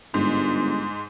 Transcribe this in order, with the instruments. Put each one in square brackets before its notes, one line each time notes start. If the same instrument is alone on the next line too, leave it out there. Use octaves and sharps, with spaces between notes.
[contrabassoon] G1 [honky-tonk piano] G#2